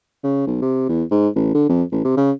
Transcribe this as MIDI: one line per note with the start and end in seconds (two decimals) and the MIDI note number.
0.24 0.46 49
0.47 0.57 35
0.62 0.85 48
0.89 1.04 40
1.11 1.28 44
1.36 1.51 33
1.55 1.66 50
1.69 1.83 41
1.92 2.04 33
2.05 2.12 48
2.17 2.32 49